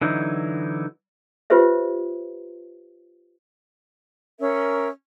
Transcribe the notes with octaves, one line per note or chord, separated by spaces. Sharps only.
D3 E3 F#3 D#4
F4 G4 B4 C5 E5
C#4 A#4 E5 E6